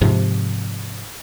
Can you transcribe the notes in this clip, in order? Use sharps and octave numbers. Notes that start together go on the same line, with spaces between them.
G#2 C3 F3